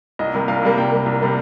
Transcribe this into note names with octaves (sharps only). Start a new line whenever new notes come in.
C2 D#5
C3 G3 A#3
C2 F5
C3 G3 A#3
C2 G5
C3 G3 A#3
C2
C3 G3 A#3